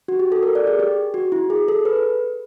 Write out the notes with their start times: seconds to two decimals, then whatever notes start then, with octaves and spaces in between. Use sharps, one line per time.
0.08 F#4
0.19 G4
0.32 A4
0.43 A#4
0.55 D5
0.67 G#4
0.80 G4
1.14 F#4
1.32 E4
1.50 G#4
1.68 A4
1.85 B4